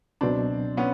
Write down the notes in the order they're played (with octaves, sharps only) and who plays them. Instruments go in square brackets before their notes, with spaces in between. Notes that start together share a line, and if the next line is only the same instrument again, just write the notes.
[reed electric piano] C#2 B2 F#3 [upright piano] C4 D4
[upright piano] B3 C#4